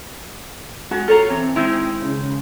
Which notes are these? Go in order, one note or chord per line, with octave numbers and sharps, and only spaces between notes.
G#3 F#4
F4 A4 C#5 A#5
E3 C4
D#3 G#3 D#4 E4
C#3